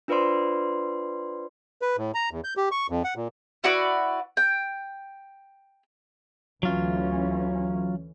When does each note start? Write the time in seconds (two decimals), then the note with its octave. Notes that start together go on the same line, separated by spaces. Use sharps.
0.08 D4 F4 B4 C5 D5 C6
1.82 B4
1.97 A2
2.14 A#5
2.31 E2
2.44 G6
2.57 G4
2.71 C#6
2.90 F2
3.04 F#5
3.16 A#2
3.64 E4 F#4 B4 D5
4.37 G5
6.63 D2 E3 F#3 C#4 F4